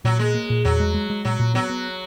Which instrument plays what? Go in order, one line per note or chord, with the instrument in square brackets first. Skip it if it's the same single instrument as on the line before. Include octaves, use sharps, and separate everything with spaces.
[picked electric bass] A#2 [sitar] F#3
[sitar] G#3 [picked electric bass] A#3
[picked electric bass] A#3
A#2
[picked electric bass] E2 [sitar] F#3
[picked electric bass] G#3
G#3
G#3
[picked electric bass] A#2 [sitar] F#3
[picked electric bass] A#2
[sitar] F#3 [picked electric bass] B3
[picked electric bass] B3